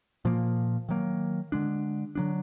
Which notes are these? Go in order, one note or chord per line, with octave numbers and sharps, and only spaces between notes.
A#2 F3 A#3
D#3 F#3 A#3
D3 G#3 D4
D3 F#3 B3 D4